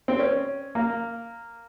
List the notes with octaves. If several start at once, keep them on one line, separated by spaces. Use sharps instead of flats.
C4
C#4
A#3